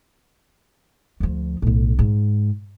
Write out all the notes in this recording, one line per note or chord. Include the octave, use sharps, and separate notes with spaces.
D2 F3
B1 A2
G#2